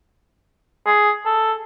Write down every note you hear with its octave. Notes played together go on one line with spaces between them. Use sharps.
G#4
A4